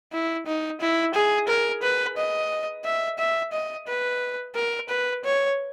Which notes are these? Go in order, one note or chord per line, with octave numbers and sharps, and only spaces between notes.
E4
D#4
E4
G#4
A#4
B4
D#5
E5
E5
D#5
B4
A#4
B4
C#5